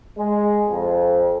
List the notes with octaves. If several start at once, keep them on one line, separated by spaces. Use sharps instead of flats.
G#3
F2